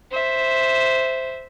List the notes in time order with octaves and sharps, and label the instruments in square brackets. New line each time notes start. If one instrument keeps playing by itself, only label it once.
[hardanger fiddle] C5 E5